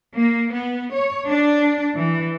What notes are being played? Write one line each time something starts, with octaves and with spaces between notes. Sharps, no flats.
A#3
B3
C#5
D4
E3